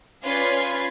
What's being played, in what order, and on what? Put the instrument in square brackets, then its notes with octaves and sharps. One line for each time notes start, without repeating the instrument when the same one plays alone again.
[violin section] C#4 F4 B4 D5 C6 G#6